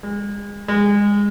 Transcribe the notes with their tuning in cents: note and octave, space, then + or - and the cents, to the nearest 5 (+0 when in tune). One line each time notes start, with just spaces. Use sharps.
G#3 -35
G#3 -25